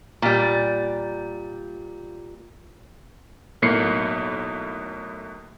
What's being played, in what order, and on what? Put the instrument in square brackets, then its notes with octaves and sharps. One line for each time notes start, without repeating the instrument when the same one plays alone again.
[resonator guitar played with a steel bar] A#2 G3
[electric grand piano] B1 A2 A#3 C7 C#7